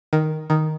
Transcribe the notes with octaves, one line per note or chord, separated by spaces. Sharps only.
D#3
D#3